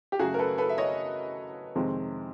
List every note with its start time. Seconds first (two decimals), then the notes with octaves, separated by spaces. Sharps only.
0.12 G4
0.19 F#2 C#3 F#3 A3 F#4 G#4
0.34 A#4
0.39 A4 B4
0.58 A4 B4
0.69 E5
0.78 C#5 D#5
1.75 F2 C3 D#3 G#3 C4